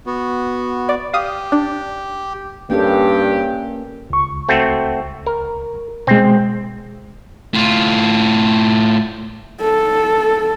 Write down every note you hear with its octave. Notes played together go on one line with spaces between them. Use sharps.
B3 F#4
D5
G4 F5 D#6
D4
G2 A#3 C#4 G4 A4
C#2 C#6
A3 C4 F#4
A#4
B2 G#3 C4
A2 F4
A4